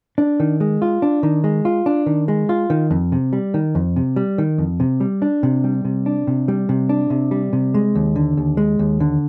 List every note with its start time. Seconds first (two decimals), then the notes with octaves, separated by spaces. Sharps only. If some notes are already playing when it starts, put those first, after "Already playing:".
0.18 D4
0.40 D#3
0.60 G#3
0.82 F4
1.02 D4
1.23 D#3
1.44 G#3
1.65 F4
1.86 D4
2.06 D#3
2.28 G#3
2.49 F4
2.70 D#3
2.91 F2
3.12 C3
3.33 G3
3.54 D#3
3.75 F2
3.96 C3
4.16 G3
4.38 D#3
4.58 F2
4.80 C3
5.00 G3
5.22 D4
5.43 C3
5.64 G3
5.85 C3
6.06 D4
6.27 C3
6.48 G3
6.69 C3
6.89 D4
7.10 C3
7.31 G3
7.53 C3
7.74 G#3
7.95 D#2
8.16 D3
8.37 D#2
8.57 G#3
8.79 D#2
9.00 D3